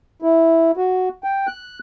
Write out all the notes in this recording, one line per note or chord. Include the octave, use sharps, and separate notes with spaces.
E4
F#4
G5
F#6